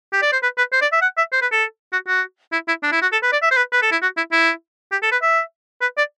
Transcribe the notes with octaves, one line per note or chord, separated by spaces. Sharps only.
G4
D5
C5
B4
B4
C5
D5
E5
F#5
E5
C5
B4
A4
F#4
F#4
E4
E4
D4
E4
F#4
A4
B4
D5
E5
C5
B4
B4
A4
E4
F#4
E4
E4
G4
A4
B4
E5
B4
D5